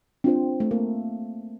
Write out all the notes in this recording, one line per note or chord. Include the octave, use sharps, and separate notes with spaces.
C4 D4 F4 C5
A3
A#3